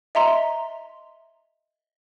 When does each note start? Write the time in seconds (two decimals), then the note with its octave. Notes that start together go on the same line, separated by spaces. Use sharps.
0.15 D#5 E5 A#5 C6